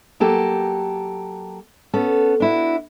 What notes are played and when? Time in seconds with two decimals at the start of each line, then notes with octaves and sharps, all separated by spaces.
0.20 F#3 A#3 G4 A4
1.94 B3 C#4 A4
2.40 D4 E4 F#4